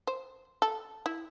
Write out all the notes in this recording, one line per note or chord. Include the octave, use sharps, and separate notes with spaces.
C5
A4
E4